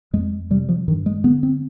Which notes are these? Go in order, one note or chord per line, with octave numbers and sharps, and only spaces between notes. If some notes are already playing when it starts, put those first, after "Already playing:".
F2 G#3
C3 G3
F3
G2 D#3
G#3
D3 B3
C4